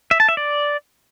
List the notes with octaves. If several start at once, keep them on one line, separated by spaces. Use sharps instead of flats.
E5
A5
E5
D5